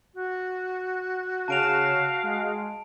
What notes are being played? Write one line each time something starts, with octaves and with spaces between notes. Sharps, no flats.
F#4
C#3 C#5 F5 A5 D7 E7 F7
G#3